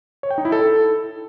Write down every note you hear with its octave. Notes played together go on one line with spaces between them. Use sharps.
C#5
G5
D#4
E4
A4